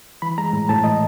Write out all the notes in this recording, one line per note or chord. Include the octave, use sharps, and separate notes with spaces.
E3 B5
G#3 A#5
A2
A2 A5
E3 D#5